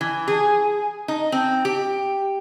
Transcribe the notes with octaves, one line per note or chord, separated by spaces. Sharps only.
E3
G#4
D#4
C4
G4